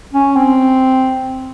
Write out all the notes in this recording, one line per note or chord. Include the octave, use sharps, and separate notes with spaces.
C#4
C4